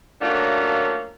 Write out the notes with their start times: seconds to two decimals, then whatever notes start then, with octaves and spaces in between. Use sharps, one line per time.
0.22 F#3 A3 A#3 C#4 D4 F4